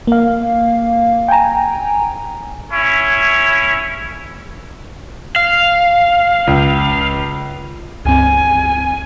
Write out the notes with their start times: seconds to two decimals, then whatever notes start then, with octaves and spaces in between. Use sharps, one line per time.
0.07 A#3 F5
1.28 G5 G#5 A#5
2.71 C#4 E4 C#5
5.36 F5
6.47 C#2
8.05 C#2 G2 C4 G#5